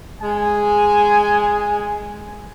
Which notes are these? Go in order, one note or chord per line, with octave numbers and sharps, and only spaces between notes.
G#3 G#5